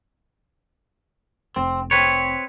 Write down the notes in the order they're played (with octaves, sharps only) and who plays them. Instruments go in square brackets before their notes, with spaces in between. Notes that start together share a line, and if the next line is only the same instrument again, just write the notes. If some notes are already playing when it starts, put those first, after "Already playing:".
[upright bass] F1 [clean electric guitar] C4
[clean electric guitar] C4 B4 C#5